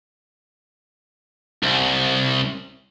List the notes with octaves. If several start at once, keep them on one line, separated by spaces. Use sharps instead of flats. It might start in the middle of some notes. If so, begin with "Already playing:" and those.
C2